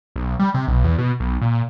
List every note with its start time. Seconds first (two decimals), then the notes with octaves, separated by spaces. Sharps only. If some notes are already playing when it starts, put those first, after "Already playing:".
0.16 B1
0.39 G3
0.54 C3
0.68 B1
0.84 E2
0.98 B2
1.20 B1
1.41 A#2